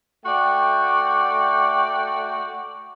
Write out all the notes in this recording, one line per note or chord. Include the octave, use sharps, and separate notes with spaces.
A3 F#4 D5 F#5 G5